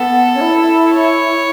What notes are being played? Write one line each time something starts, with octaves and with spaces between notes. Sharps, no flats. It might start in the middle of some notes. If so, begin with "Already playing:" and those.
Already playing: B3 A4
C#4
E4
C#5